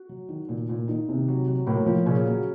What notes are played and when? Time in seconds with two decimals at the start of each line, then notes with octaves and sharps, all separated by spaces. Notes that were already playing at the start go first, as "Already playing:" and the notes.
Already playing: F#4
0.09 F#3
0.29 D#3
0.49 A#2
0.69 A#2
0.88 D#3 D#4
1.09 C3
1.28 F#3
1.48 F#3
1.66 A2 A#3
1.86 F3
2.06 A#2 C#3 C#4
2.26 F#3